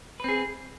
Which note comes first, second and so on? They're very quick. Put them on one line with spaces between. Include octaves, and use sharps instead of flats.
B4 C4 G#4